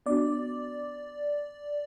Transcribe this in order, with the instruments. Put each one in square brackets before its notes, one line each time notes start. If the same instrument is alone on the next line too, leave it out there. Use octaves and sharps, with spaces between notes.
[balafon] B3 D4 F#4 [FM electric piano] D5